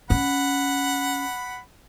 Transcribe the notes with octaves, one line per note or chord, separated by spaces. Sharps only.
C#4 F#5 B5